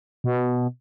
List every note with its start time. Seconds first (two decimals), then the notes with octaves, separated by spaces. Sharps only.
0.24 B2